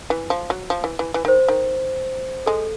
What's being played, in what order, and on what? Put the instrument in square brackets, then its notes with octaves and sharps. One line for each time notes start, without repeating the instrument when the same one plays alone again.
[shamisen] E3
F3
F#3
F3
E3
E3
E3
[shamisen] D#3 [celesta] C5
[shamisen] D#3
[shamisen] G#3 [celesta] A4